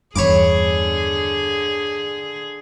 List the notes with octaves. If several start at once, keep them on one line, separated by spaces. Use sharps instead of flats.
E2 G2 D3 G#4 C#5 B5 D6